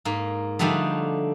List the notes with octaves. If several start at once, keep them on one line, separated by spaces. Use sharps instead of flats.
G#2 A#3
D3 F3 G3 A3 D4 D#4